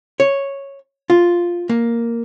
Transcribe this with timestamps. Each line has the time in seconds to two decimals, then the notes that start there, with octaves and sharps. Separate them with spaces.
0.20 C#5
1.10 F4
1.69 A#3